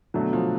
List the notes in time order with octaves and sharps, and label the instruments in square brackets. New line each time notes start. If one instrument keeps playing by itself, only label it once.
[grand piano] B2 F#3 A3 [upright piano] D3
[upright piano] F3